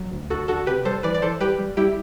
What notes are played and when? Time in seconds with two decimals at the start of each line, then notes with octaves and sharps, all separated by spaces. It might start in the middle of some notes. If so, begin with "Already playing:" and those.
Already playing: F#3
0.12 D2
0.30 D2 F#4 A4
0.48 D3 F#4 A4
0.67 C3 G4 B4
0.85 G3 A4 C5
1.03 E3 B4 D5
1.14 D5
1.22 E3 A4 C5
1.40 G3 G4 B4
1.58 G3
1.77 G3 E4 G4